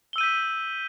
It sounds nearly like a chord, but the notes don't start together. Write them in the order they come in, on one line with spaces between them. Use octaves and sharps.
G7 E6 D#7 G6 B6